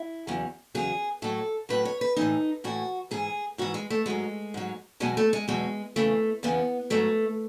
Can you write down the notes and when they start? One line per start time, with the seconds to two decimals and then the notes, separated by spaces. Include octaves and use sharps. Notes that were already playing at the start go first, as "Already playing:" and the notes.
Already playing: E4
0.27 E2 C#3 F#3
0.75 E2 C#3 F#3 G#4
1.22 A2 F#3 A4
1.69 A2 F#3 B4
1.85 C#5
2.01 B4
2.16 A2 E3 D#4
2.64 A2 E3 F#4
3.11 G#2 E3 G#4
3.58 G#2 E3 F#4
3.74 G#3
3.90 A3
4.06 G#2 F#3 G#3
4.54 G#2 F#3
5.00 E2 B2 F#3 G#3
5.17 A3
5.33 G#3
5.48 E2 B2 F#3 G#3
5.96 E2 C#3 E3 A3
6.43 E2 C#3 E3 B3
6.90 G#2 F#3 A3